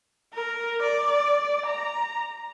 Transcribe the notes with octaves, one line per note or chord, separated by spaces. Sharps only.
A#4
D5
A#5